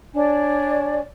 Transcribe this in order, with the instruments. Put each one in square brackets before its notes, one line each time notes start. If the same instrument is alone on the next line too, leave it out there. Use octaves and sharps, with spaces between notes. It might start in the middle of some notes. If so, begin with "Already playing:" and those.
[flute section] D4 C#5 D5 G#5